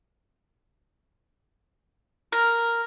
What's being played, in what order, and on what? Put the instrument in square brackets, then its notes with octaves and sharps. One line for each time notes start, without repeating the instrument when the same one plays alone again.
[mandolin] A#4